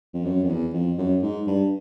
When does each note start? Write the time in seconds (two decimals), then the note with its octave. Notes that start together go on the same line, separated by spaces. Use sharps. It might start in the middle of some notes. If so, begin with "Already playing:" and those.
0.14 F2
0.25 F#2
0.44 F2
0.49 E2
0.74 F2
0.98 F#2
1.22 G#2
1.47 G2